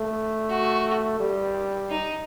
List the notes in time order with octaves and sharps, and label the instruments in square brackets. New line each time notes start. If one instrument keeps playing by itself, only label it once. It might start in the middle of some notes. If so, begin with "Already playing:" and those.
Already playing: [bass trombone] A3
[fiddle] F#4
[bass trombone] G3
[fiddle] D#4